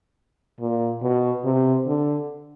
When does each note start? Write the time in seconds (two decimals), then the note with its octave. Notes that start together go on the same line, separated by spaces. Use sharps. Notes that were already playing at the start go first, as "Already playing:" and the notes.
0.60 A#2
1.02 B2
1.45 C3
1.87 D3